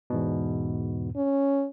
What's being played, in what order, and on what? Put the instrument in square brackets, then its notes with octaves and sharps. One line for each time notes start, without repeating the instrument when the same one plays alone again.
[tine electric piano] E2 G#2 B2
[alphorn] C#4